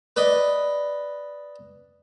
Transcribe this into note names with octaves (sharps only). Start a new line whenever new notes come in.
B4 D5 D#5